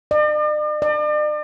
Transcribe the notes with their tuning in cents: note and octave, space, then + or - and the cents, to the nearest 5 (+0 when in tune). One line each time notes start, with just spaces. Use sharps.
D5 +45
D5 +40